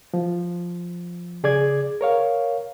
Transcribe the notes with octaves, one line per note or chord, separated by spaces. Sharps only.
F3
C#3 G#4 D5 D6 G#6
A#4 C#5 F5